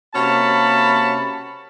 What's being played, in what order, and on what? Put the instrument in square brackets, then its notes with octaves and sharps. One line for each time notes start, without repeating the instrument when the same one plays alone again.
[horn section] C3 A#3 C#4 F#4 A5 B5